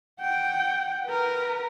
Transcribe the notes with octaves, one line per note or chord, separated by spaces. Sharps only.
F#5 G5
A#4 B4